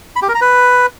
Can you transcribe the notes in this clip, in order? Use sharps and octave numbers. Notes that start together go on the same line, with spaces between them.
B5
G4
A#4
A#5
B4